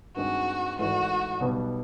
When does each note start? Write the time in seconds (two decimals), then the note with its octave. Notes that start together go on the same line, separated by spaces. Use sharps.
0.16 G2 D#3 G#3 C4 F#4
0.78 G#1 G#2 E3 A3 F#4
1.40 B1 B2 G3 B3